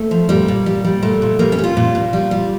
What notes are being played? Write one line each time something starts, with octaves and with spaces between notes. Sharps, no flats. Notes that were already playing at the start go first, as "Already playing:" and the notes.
Already playing: A3
F3
A#2 G3
A#2
G3
G3
A#2 A3
A#2
G3 A#3
C#4
G3 F4
A#2
A#2
G3
G3